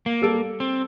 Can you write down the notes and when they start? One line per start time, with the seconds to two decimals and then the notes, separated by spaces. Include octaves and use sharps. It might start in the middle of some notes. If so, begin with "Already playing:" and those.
0.06 A#3
0.22 G3 A4 D7
0.60 C4